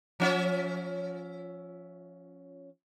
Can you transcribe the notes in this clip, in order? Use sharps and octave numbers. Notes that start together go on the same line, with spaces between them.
F3 C#4 E5